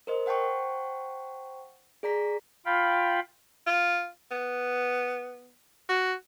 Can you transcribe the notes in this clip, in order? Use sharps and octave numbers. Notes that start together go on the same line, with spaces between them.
A#4 C5 D#5
C5 F#5 G5 A5 C#6
G#4 D5 A#5 B6
F4 F5 G5 B5
F4
B3
F#4